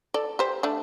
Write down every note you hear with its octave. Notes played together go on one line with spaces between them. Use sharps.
A4 D5
G4 C5
A3 D4